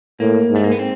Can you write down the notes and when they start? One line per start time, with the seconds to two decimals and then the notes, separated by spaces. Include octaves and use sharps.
0.20 A2 A#3
0.50 G#2
0.56 A3
0.64 A#3
0.72 B3
0.79 C4